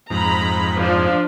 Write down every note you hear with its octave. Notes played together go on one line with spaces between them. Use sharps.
F2 G#2 A#5 B5
F3 D4